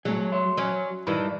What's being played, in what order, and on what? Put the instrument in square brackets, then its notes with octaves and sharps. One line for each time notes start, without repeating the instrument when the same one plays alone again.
[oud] F#3 [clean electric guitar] A3 G#4
[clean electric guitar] C#5 E5 C6
[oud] F#3 C#4
[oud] G2 D#3 E3 [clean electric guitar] B5